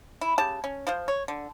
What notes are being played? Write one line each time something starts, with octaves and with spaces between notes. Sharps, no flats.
E4
C#3 G4 A5
C#4
F3 F4 C5
C#5
D3